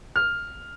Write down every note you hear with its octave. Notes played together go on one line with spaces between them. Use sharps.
F6